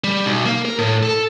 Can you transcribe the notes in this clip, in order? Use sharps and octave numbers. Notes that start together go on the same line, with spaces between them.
G3
B1
A#3
A#4
A2
A4